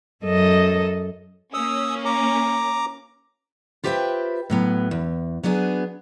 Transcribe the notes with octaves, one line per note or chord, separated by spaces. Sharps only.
F#2 A4 D#5
A#3 C#4 D#6 E6
A#5 D6
F4 G4 B4 C5 E5 G5
A2 F#3 B3
E2
F#3 B3 D4 G#4